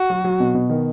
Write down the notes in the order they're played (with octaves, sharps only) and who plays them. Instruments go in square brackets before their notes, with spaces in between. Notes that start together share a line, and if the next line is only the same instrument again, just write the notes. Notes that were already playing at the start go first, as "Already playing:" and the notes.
Already playing: [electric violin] F#4
[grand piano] F#3
F#3
B2
B2
D#3